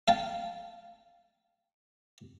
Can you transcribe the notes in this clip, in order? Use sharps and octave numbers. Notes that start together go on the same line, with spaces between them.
F5 G5 A5